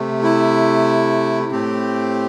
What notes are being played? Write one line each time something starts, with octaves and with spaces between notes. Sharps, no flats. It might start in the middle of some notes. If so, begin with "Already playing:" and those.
Already playing: C3 A3
E4
A2 A3 C4 G4